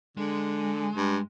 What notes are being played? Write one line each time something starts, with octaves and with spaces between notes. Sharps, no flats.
D3 G#3
G2